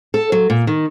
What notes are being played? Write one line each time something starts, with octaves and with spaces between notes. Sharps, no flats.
A4
F#3
A#2
D#3